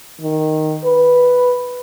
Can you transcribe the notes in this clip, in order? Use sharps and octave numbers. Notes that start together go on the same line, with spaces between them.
D#3
B4